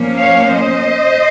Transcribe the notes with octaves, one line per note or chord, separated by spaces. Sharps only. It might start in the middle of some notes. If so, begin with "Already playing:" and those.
Already playing: A#2 F3 A#3 C#4
C#5 F5
C5 D#5